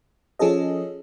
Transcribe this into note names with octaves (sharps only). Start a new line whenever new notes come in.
F3 C#4 G#4 A4 D#5